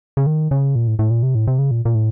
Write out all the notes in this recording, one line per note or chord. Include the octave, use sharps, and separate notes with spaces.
C#3
D#3
C#3
A#2
A2
A2
A#2
C3
A2
C3
C#3
A#2
A#2
A2